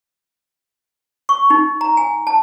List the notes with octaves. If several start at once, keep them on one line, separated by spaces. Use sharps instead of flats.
C#6
D#4
A#5
G#5
A5